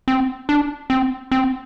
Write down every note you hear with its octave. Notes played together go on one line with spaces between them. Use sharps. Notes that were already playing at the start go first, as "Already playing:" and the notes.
C4
D4
C4
C4